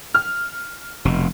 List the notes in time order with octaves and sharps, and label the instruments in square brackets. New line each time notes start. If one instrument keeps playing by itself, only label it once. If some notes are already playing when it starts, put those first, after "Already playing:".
[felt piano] F6
[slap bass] F1 B2